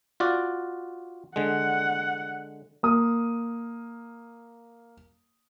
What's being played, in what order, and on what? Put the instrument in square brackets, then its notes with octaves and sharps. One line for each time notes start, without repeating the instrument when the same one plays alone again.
[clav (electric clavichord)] F4 F#4 D5
[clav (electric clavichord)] D3 G#3 [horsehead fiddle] F#5
[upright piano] A#3 D#6